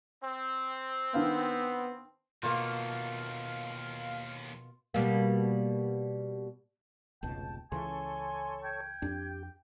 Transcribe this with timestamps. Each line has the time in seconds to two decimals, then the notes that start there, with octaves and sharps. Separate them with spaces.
0.22 C4
1.14 D#3 B3 D4 F5
2.43 D#2 B2 A3 A#3 F4 F5
4.94 B2 G3 A#3
7.23 F1 C#2 B2 G5 A5
7.72 C#2 C#3 E3 A4 C#5 G#5 C6
8.64 G5 G#6
9.02 F2 D4 G4